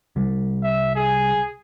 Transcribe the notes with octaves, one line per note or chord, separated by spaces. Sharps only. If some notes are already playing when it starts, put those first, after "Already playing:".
C2 G3
E5
G#4